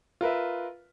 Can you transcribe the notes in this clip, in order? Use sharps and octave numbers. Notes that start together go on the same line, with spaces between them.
F4 A#4 B4 E5